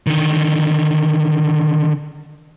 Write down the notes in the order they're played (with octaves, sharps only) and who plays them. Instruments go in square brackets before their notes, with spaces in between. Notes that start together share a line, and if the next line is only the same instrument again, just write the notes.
[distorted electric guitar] D3 D#3